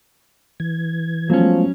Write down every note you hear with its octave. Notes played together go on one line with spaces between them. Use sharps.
E3 G#6
F3 F#3 G#3 A3 B3 C#4